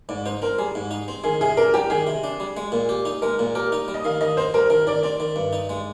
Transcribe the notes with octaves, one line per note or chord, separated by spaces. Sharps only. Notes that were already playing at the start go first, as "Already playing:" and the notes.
G#2 D5
D#4 C5
C4 A#4
G3 G#4
G#2
D#4
C4
D#3 G#4
C3 G#4
D4 A#4
G3 G4
D#3 G#4
C3
D4
G3
G#3
A#2
G4
D#4
G#3 A#4
A#2
G4 A#4
D#4
G3
D#5
D#3 F5
D#3 D#5
C4 C5
G3 A#4
D#3 A#4
D#3 D5
C4 D5
D#3
G2
D#4
G#3